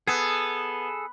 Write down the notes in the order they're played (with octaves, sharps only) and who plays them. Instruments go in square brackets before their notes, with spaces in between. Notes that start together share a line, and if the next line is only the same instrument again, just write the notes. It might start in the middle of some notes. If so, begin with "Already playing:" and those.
[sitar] B3 [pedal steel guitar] G#4 A4